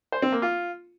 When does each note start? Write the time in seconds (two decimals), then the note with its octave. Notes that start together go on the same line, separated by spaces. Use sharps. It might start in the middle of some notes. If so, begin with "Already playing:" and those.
0.12 C5
0.22 C4
0.32 A#3
0.42 F4